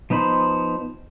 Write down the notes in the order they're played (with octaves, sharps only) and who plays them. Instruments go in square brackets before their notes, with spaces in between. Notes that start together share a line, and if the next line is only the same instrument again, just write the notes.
[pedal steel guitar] F3 B3 D#4 C5 B5